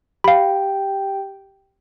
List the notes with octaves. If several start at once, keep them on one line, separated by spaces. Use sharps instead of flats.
G4 F5 G5 B5